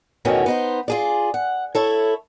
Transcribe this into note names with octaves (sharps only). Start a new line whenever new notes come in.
E2 B2 D#3 E3 A3 C#4
B3 D#4 C5
F4 G#4 D5
F#5
E4 A4 C#5